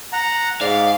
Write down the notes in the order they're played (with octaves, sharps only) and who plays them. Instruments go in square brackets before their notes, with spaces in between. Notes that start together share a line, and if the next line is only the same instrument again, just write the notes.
[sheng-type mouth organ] F#5 A#5
[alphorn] G#2 [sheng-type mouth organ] D5 [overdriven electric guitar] F5